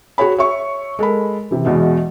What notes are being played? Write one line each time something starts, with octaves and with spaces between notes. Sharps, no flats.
F#4 G#4 C#5 B5
C#5 E5 C#6
G#3 A4 A#4 B5
C3 E3
E2 B2 E3 G#3